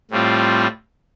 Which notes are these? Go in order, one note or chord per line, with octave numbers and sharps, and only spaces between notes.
A2 G3 C4 F4